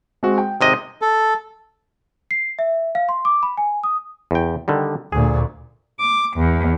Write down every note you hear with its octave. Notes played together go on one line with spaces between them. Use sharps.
G#3 C4 F#4
G5
G#1 C3 D#5 D#6
A4
C7
E5
F5
C6
D6
B5
G#5
D#6
E2 G5
D3 D#3 G3
D2 A#2 G#4
D6
E2